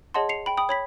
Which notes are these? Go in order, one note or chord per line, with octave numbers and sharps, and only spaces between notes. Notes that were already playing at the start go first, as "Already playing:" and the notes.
G#4 C#5 D#5 F#5 A5 C6
C7 C#7 F7
G5 B5
G5 B5 D#6
C#5 B5 B6